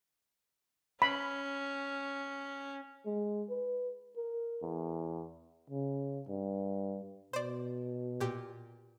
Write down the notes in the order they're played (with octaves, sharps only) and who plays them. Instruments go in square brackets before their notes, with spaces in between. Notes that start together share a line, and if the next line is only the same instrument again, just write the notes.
[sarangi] C#4 [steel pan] B5
[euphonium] G#3
B4
A#4
E2
C#3
G2
[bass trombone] B2 [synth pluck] C5 D5
[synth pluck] A#2 G4